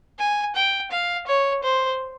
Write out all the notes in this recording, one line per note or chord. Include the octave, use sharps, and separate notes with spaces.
G#5
G5
F5
C#5
C5